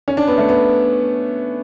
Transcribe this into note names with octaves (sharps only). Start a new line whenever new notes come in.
C#4
D4
B3
A3
B3